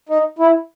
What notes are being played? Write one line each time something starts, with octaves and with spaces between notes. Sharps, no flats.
D#4
E4